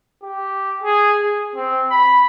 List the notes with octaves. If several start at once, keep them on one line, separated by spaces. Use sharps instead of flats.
G4
G#4
G#4
C4
B5